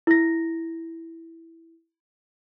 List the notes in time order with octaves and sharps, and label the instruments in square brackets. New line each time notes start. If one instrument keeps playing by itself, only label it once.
[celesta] E4 A#6